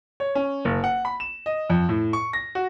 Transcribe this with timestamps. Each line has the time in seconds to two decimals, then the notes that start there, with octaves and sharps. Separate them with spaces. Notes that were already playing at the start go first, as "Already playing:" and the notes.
0.20 C#5
0.35 C#4
0.65 F#1
0.84 F#5
1.05 B5
1.20 E7
1.46 D#5
1.70 F2
1.89 A2
2.13 C#6
2.33 A#6
2.55 F#4